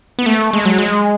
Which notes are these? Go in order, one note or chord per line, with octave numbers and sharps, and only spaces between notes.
B3
A3
G#3
F#3
G#3